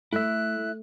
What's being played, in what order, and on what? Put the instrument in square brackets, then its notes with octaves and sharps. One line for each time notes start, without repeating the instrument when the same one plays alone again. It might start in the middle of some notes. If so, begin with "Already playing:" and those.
[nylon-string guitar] A3 [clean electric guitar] E4 E5 [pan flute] F#6